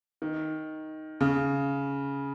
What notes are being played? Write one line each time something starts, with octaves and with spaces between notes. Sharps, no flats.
D#3
C#3